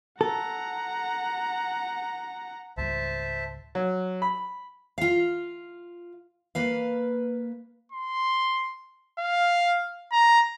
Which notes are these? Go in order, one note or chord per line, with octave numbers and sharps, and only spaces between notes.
A4 F#5 A#5
C#2 G#2 G3 C5 E5 A5
F#3
B5
F4 F5
A#3 B4 F5
C6
F5
A#5